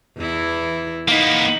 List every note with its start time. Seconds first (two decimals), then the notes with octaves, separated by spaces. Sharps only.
0.17 E2 E3 E4
1.08 A#3 B3 D#4